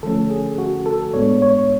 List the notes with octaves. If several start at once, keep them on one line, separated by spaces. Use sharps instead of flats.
D3 F3 A3 C#4 A4
G#4
F#4
A4
A2 G#3 B3 D4 C#5
C#5